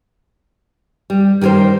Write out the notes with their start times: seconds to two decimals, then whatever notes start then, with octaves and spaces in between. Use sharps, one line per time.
1.10 G3
1.41 D#3 G3 G#4 A#4 C5